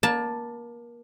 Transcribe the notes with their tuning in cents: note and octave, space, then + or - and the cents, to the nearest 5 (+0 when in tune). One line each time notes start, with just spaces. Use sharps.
A#3 +30 A5 +0